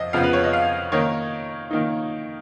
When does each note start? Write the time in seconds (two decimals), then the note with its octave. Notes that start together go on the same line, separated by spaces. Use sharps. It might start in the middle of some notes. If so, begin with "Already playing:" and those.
Already playing: F2 F3 D#5
0.13 F2 C#3 F3 B3 F5
0.23 B4
0.33 C#5
0.44 D#5
0.53 F5
0.92 D#3 A#3 D#4 C#5
1.71 D#3 A#3 D#4